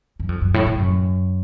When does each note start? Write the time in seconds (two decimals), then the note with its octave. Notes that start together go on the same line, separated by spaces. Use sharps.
0.20 F#2
0.29 F2
0.41 F#2
0.54 A2
0.67 A2
0.79 F#2